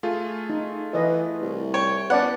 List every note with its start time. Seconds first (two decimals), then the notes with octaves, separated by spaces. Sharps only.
0.03 A3 F4 G#4
0.50 D#4
0.93 E3 B4 D#5 E5
1.41 C2
1.74 C#5 G5
2.10 B3 C#4 B4 D5 F#5 A5